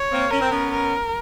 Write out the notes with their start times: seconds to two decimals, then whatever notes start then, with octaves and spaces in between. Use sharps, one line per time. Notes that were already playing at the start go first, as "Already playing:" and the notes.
Already playing: C#5
0.11 A#3 C4
0.31 C#4 A#4
0.41 C4
0.51 B3 C#4
0.71 A#4